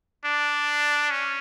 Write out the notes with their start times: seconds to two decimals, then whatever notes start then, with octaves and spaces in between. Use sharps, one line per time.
0.25 D4
1.11 C#4